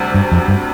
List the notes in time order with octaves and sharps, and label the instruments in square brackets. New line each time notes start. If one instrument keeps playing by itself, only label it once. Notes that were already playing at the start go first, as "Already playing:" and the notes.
Already playing: [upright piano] D2 C3 G3
[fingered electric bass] G2
F2
G2